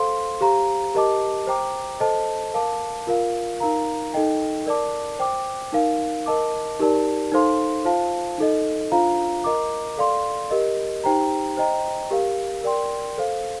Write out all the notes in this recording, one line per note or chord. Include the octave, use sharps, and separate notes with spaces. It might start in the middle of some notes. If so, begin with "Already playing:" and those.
Already playing: A4 C5 F5 C6
G4 C5 F5 A#5
G4 A#4 D#5 A5 D6
C5 G5 A#5 D6
A4 C5 D#5 A5
A#4 F5 A5 D6
F4 A#4 F5
D#4 A#4 F5 A#5
D#4 A4 D#5 G5
A#4 D5 A5 D6
C5 G5 D6
D#4 A#4 F5
A#4 D#5 A5 D6
D#4 G4 A#4 D5 A5
D#4 A4 C5 F5 C6
F4 C5 F5 A5
D#4 A4 D#5
D4 F4 C5 F5 A#5
A#4 D#5 A#5 D6
A4 D5 F5 C6
G4 A#4 D#5
D#4 G4 C5 G5 A#5
C5 D#5 G5 A#5
G4 A#4 F5
A#4 D5 G5 C6
A4 C5 F5